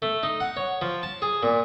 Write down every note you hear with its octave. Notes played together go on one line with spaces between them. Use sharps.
A3
D#4
F#5
C#5
F3
A5
G#4
A#2